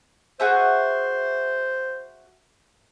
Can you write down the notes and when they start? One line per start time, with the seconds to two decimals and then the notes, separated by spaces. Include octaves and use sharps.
0.40 F#4 G#4 C5 E5